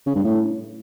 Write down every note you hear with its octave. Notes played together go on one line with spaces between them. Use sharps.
C#3
G2
A2